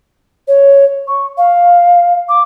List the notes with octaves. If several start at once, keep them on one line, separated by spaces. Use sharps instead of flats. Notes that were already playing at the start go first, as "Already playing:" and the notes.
C#5
C#6
F5
D6